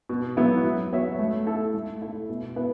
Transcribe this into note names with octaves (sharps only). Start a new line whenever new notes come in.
B2
F#3 B3 E4
F#3
B3 F#4 C#5 E5
A3
E4 A4
A3
E4 A4
B2
B3 E4 B4